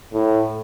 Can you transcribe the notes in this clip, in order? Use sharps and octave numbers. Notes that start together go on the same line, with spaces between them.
A2